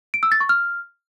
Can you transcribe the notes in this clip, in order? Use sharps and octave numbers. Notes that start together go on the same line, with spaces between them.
D7
E6
A6
C#6
F6